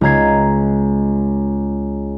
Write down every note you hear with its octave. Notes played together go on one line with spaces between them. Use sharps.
C#2 D#5 A#5 G#6 C7